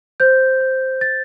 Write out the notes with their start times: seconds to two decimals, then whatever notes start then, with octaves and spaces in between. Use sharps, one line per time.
0.20 C5 G6
0.61 C5
1.01 C5 A6